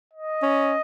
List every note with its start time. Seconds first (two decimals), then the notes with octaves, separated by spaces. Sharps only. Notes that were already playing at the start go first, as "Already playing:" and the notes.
0.13 D#5
0.43 C#4